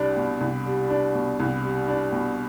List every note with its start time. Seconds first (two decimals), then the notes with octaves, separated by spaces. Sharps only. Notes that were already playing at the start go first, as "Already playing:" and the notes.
Already playing: C2 G3 D4
0.17 B2
0.41 C2
0.66 G3
0.90 D4
1.15 B2
1.40 C2
1.63 G3
1.88 D4
2.12 B2